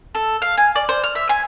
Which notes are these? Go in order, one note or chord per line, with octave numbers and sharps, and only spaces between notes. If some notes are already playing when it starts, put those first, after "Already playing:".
A4
F5
G#5
D5
C5
F6
E5
G#5